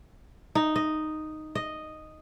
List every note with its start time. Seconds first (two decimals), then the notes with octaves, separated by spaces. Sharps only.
0.55 D#4
0.76 D#5
1.55 D#5